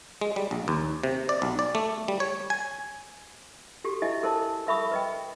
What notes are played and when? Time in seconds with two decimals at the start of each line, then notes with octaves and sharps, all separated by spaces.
0.21 G#3
0.36 G3
0.51 A#1
0.68 D#2
1.03 C3
1.29 D5
1.42 B1
1.59 D5
1.75 A3
2.08 G3
2.20 C#5
2.50 G#5
3.84 F#4 G4 A4
4.02 E4 D#5 E5 G#5
4.23 A4 A#4 C5 A5
4.67 A4 A#4 E5 B5 C#6 D#6
4.91 B4 D#5 G5